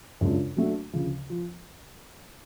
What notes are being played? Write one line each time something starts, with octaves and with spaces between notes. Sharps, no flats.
F#2 C#3 G#3 D4 F4
F#3 A3 D4 F#4
D2 C#3 F3
F3